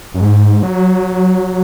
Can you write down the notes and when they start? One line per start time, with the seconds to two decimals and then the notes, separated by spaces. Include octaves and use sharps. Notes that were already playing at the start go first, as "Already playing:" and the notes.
0.14 F#2
0.21 G#2
0.63 F#3